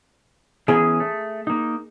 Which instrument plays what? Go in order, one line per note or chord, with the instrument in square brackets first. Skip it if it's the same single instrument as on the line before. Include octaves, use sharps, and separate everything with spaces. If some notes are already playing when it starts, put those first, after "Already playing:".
[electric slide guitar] E3 B3 C#4 [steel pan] G#4
[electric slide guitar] A3
A#3 D#4